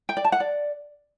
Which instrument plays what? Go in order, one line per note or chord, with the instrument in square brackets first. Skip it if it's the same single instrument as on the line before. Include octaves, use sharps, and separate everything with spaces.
[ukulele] G5
D5
A5
F#5
D5